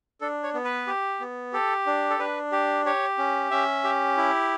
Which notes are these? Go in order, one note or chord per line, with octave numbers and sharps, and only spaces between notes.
D4 A4
C#5
B3
B4
G4
B3
G4 A4
D4
A4
D4 B4
G4
G4 C#5
C#4
C#4 E5
G4
E4